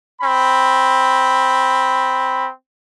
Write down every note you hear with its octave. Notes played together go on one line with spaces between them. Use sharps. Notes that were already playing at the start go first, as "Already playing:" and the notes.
C4 B5